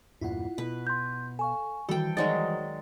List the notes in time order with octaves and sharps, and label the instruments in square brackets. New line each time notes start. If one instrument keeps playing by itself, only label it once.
[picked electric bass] E2 G2 A#2 [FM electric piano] E4 F4 F#5
[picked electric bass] B2 [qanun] B4
[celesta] C6 G6
[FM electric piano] A4 F5 [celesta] G#5 C#6
[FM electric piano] D#3 [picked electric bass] E3 G3 [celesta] F#4 [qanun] A4 G5
[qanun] D#3 F#3 G#3 [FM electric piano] D#4 F#4 C5 [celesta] D5 A6